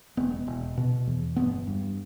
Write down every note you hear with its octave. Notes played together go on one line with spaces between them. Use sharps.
E1 B3
E1
B2
E2
G1 B3
G2